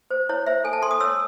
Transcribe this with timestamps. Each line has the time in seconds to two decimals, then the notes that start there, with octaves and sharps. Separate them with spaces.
0.11 C5
0.29 E4 C#5
0.46 C5 E5
0.64 A4 G#5
0.73 A5
0.82 A4 C6
0.91 D#6
1.00 C#5 E6